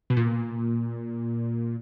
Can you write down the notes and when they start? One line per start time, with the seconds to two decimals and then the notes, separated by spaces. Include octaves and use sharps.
0.10 B2
0.17 A#2